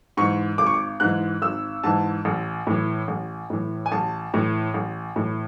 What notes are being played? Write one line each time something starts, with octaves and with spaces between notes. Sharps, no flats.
G#2 E3 C#6
G#1 D6
C#6
D6
G#2 E3 F#6
G#1 E6
G#2 E3 A5
A1
A2 E3
A1
A2 E3
G#5
A1 A5
A2 E3
A1
A2 E3